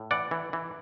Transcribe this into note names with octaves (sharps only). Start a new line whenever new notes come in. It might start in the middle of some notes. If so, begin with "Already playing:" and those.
Already playing: A2
E3 D5 F#5
E3
E3